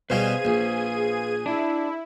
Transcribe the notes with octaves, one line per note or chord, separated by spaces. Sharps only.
B2 G3 G#4 B4 C5 F5 G#6 D#7
A#1
D4 E4